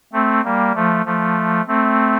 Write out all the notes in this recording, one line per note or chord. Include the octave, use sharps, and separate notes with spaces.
A3 C4
G3 A#3
F3 A3
F3 A3
A3 C4